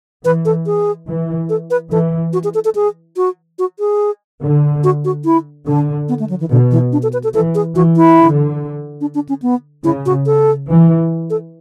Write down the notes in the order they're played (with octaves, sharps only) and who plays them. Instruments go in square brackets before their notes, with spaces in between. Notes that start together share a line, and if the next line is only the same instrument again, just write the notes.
[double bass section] E3 [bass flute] B4
[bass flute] A4
G#4
[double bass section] E3
[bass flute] A4
B4
[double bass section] E3 [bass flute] A4
[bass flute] F#4
G#4
A4
A4
G#4
F#4
F#4
G#4
[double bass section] D3
[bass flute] F#4
F#4
E4
[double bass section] D3 [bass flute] D4
[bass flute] B3
A3
F#3
E3
[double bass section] B2 [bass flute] D3
[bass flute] E3
D4
A4
B4
A4
[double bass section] E3 [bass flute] A4
[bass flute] G#4
[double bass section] E3 [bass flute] F#4
[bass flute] E4
[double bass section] D3
[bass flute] D4
D4
C#4
B3
[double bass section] C#3 [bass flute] E4
[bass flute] F#4
A4
[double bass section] E3
[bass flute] A4